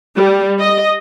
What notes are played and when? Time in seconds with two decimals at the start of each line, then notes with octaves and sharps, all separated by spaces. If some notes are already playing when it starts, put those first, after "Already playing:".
0.16 G3
0.60 D#5